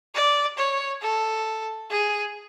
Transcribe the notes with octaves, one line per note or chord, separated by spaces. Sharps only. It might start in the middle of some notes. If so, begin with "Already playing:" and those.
D5
C#5
A4
G#4